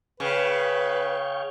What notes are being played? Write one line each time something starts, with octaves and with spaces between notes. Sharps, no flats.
C#3 B4 F5 G5 C#6